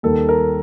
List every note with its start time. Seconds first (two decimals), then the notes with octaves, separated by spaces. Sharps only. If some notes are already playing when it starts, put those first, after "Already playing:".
0.03 D#2 D#3 G3 A#3 A4
0.29 A#4